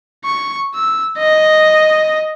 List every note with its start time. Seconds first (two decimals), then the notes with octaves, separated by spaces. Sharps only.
0.25 C#6
0.75 E6
1.18 D#5